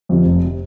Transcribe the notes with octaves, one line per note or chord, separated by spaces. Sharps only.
F2 C3
F1
C3